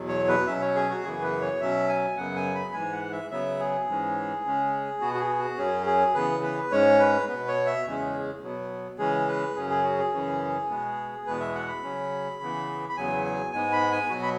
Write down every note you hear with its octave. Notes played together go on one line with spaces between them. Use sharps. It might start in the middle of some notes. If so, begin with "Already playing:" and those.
Already playing: E2 B2 F#3
C#5
B4
B2 F#3 C#4 E5
C#5
G#4
F#4
F#2 C#3 E3 B3 G#4
B4
C#5
B2 F#3 C#4 E5
G#5
F#2 C#3 F#3 B3 F#5
G#5
B5
G#2 E3 G#3 G#5
F#5
E5
C#3 F#3 B3 E5
G#4
G#2 E3 G#3 C#4
C#3 G#3 C#4
B2 B3 F#4
F#4
G#4
F#4
F#2 F#3 C#4 G#4
G#4
C#3 E3 B3 B4
B4
G#2 G#3 C#4 C#5
B4
B2 B3 B4
C#5
E5
E2 C#3 G#3 C#4
B2 F#3 B3
C#3 E3 G#3 C#4 G#4
B4
F#2 C#3 F#3 C#4 G#4
G#4
F#4
G#4
F#2 C#3 E3 C#4
B2 G#3 B3
E2 B2 G#3 B3 B4
E5
F#5
B5
C#3 F#3 C#4
C#3 E3 B3
B5
E2 C#3 F#3 B3 G#5
G#5
G#2 G#3 B3 G#5
B5
G#5
B2 F#3 B3 F#4
B5